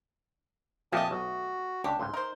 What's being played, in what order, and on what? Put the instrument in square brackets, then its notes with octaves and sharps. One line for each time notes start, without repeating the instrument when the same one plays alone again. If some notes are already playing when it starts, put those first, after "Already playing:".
[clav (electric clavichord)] F2 A#2 F3 [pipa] A3 D#5 [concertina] G4 G#5 A5
[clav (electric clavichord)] B1 [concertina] F#4
[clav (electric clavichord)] C#2 [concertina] D4 [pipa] G4
[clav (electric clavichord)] C#2 G#2 [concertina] C6
[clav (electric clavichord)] D#4 [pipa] A#4 C5